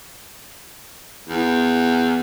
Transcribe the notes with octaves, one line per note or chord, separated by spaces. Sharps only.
E2